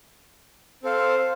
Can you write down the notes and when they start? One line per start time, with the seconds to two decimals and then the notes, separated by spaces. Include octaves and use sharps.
0.83 C4 A4 C5 F5